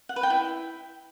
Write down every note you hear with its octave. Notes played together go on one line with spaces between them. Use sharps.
F#5
B4
G5
E4